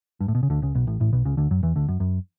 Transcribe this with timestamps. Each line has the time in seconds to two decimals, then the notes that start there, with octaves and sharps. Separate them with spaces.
0.20 G2
0.28 A2
0.35 B2
0.43 C#3
0.50 D2 D3
0.62 C#2 C#3
0.75 B1 B2
0.87 A1 A2
1.00 A1 A2
1.13 B1 B2
1.25 C#2 C#3
1.37 D2 D3
1.51 F#2 F#3
1.63 E2 E3
1.76 D2 D3
1.88 F#2
2.00 F#2